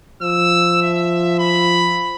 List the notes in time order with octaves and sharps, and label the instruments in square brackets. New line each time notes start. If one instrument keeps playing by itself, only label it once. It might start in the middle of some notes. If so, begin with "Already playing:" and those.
[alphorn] F3 [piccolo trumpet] E6
[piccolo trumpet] E5
B5